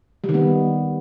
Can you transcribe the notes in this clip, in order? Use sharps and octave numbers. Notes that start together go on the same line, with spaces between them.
G3
D#3
B3